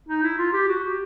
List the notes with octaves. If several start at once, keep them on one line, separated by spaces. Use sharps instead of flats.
D#4
E4
F4
G4
F#4
G4